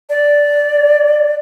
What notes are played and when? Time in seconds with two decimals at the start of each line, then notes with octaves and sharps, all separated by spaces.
0.09 D5